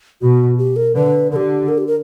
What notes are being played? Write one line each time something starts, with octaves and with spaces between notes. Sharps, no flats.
B2 F#4
G4
A#4
D3 B4
D3 G4 A#4
A#4
G4
A#4